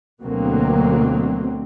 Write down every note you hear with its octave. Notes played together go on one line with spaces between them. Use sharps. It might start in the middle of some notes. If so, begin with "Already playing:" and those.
D2 B2 D3 F#3 A#3 C4